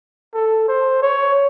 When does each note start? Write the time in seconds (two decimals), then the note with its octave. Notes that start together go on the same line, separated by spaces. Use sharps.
0.34 A4
0.68 C5
1.03 C#5